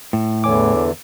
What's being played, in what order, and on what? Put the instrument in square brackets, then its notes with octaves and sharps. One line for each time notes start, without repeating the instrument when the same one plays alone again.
[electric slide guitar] A2
[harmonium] E2 D3 E3 [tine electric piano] C#5 G#5 D6